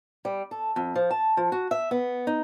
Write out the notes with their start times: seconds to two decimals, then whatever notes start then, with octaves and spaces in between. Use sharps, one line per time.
0.25 G3
0.51 A4
0.76 F2
0.95 F3
1.11 A5
1.37 F3
1.52 F#4
1.71 E5
1.91 B3
2.27 D#4